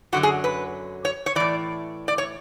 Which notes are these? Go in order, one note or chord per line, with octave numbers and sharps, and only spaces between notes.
F#2 D3 F#3 F#4
G#4
B4
C#5
C#5
A2 E3 D5
D5
C#5